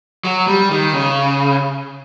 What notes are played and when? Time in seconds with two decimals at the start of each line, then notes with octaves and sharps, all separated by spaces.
0.25 F#3
0.47 G3
0.71 D#3
0.94 C#3